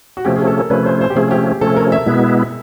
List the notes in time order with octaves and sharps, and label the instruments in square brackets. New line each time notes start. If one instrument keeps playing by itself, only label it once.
[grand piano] F#4
[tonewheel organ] C3 F3 A3 C#4 [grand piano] G4
[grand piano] G#4
A4
A#4
[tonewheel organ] C3 F3 A3 C#4 [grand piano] B4
[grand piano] C5
C5
G4
[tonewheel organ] C3 F3 A3 C#4 [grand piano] G#4
[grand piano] G4
[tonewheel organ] C3 F3 A3 C#4 [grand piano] A4
[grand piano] A#4
E5
[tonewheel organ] B2 G#3 B3 E4